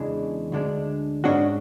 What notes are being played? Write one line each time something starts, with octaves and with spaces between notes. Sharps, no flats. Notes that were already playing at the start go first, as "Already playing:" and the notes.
Already playing: E2 C#3 E3 G#3 D4
D2 D3 G#3 D4
G#2 G#3 C#4 D4 F#4